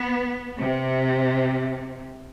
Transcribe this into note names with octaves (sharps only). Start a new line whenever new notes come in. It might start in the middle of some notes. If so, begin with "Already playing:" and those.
Already playing: B3
C3